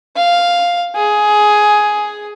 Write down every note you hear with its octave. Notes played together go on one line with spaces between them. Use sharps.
F5
G#4